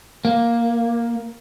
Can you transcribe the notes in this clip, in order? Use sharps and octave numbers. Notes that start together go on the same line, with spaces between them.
A#3